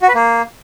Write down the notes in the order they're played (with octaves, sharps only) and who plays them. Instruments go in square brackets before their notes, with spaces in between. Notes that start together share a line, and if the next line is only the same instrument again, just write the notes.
[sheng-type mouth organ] F#4
B4
A#3